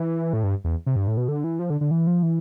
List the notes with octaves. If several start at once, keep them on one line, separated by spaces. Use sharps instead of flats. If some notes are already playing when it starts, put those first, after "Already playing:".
Already playing: E3
A2
G2
E2
C3
G2
A2
B2
D3
E3
F3
D3
D3
E3
F3
E3